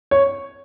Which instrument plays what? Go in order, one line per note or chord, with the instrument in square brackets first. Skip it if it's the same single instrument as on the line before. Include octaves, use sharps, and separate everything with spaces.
[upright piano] C#5